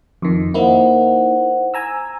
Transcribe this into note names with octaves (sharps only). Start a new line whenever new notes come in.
F2 D#3
A#3 D#4 E4 C5 F#5
G#5 A#5 E6